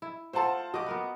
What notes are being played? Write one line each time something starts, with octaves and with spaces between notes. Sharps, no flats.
E4
A3 F4 A4 C5 F#5 A5
F#4 G4 D#5 D6
B3 A#4 B4